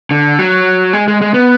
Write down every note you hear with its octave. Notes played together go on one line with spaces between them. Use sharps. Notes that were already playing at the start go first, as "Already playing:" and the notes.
D3
F#3
G#3
G#3
G#3
B3